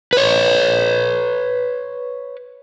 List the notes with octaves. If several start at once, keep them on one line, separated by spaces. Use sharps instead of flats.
B4 C#5